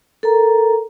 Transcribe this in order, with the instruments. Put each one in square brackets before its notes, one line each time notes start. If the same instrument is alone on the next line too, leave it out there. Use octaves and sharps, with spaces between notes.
[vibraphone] A4 A#4 A#5